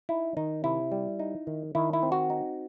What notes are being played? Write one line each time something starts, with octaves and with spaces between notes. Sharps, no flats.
D#4 E4
D#3 D#4
C3 E4
G3
D#4
D#3
D#3 E4
E4
C4
F#4
D#4